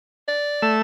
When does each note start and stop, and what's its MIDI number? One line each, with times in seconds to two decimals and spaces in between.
0.28 0.75 74
0.62 0.82 57
0.62 0.82 88